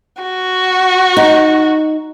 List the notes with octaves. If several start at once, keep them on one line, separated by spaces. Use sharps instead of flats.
F#4
D#4